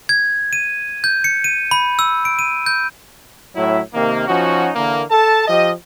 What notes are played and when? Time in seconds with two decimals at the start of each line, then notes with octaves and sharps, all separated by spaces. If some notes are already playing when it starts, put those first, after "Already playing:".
0.09 G#6
0.53 D#7
1.04 G6
1.24 C#7
1.44 D#7
1.71 B5
1.99 E6
2.25 D7
2.39 D#7
2.66 G6
3.56 A2 F#3 E4
3.94 C3 D#3 A#3
4.28 F3 C#4 D#4 F#4
4.76 D3 E3 A#3
5.10 A4 A5
5.47 F3 G4 D#5